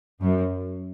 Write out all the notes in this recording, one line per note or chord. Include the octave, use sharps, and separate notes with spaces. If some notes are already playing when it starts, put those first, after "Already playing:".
F#2